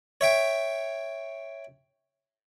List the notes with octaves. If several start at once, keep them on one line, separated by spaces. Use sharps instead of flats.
C#5 E5 G5